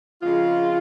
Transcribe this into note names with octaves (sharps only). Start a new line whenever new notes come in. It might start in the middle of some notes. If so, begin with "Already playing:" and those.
F2 C#3 G#3 F4